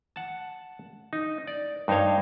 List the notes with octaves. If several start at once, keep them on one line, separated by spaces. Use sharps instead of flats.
F#5 A5
D#4
D5
G2 D#4 C5 C#5 F5